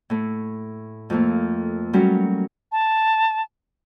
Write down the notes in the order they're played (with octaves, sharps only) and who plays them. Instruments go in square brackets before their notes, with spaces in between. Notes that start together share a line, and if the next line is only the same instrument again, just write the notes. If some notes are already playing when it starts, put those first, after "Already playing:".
[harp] A2 A3
F2 F3 A3 A#3
F#3 G3 A3 C#4 A#4
[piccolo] A5